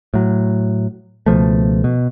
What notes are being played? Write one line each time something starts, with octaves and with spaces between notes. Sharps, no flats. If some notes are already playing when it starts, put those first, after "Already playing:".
A2 F#3
C#2 B2 F3 A3
B2